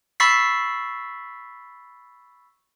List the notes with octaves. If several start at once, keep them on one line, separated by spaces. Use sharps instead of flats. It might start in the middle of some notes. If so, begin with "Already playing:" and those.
B5 C#6 E6 A6 B6 C7